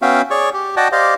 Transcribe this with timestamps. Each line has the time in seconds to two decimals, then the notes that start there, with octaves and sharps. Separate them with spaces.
0.02 B3 C#4 F#4 E5 F5 G5
0.31 G#4 C#5 D5 C#6
0.54 G4
0.77 F#4 D5 D#5 F#5 G5 A5
0.92 G4 C5 D5 D#5 F5